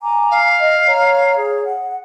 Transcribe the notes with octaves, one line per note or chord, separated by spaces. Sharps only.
G#5 A#5 D6
F5
D#5
C#5 A#5
G#4 C#5
F#5